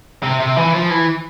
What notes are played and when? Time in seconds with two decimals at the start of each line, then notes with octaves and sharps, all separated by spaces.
0.23 C3
0.40 C3
0.57 E3
0.74 F3
0.90 E3